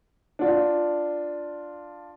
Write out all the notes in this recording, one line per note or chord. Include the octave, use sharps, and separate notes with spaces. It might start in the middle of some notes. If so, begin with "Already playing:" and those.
D4 F4